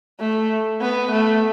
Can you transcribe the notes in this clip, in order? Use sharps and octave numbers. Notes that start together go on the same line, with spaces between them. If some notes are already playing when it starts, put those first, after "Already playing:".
A3
B3
A3